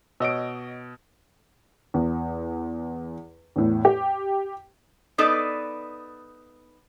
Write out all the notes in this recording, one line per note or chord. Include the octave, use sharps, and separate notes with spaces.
B2 C#5 D#5 E6 D7
E2
E2 A2
G4
B3 D#4 A4 B4 D5